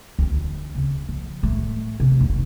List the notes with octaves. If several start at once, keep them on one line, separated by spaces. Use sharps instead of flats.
D2 C4
C#3
F3
A2 A3
C3 F3
F1 C3